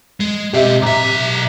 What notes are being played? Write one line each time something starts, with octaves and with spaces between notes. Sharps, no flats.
G#3
B2 C4 G4 D#5 E5
B1 E5 A#5 D6